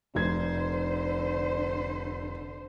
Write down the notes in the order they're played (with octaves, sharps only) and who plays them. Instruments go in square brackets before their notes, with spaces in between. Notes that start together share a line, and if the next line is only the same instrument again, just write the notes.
[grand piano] F1 G#6 [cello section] D3 C5